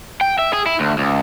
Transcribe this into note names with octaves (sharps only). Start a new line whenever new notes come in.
G5
E5
G#4
E4
D2
C#2